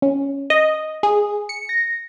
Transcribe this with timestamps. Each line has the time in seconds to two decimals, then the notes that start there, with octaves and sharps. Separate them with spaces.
0.02 C#4
0.50 D#5
1.03 G#4
1.49 C#7
1.69 A#6